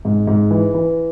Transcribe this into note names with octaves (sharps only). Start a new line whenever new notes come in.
G#2
G#2
E3
E3